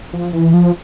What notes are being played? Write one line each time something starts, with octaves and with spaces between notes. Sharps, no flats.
F3
E3
F3